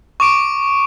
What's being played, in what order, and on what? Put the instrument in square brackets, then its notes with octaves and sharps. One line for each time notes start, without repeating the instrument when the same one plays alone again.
[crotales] C#6 D6 D7